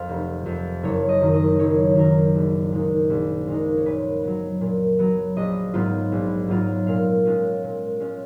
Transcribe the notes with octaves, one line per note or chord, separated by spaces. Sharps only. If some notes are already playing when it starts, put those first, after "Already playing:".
Already playing: F2 F3 F5
F1
F2 F3
F#1 C#5
D#5
F#2 D#3
D#5
F#1 C#5
F#2 D#3 A#4
A#1
A#2 G#3 D#4
A#1
A#2 G#3 D#4
C#5
A#2 B4
F#3 B3
A#2
F#3 B3
A#1 D#5
G#2 F#3 B3 F4
A#1
G#2 F#3 B3 F4
A#2 F5
G#3 C#4 F4
A#2
G#3 C#4 F4